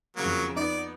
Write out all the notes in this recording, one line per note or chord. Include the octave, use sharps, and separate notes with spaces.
F2 C#3 F#3 A#3
B3 D#4 D5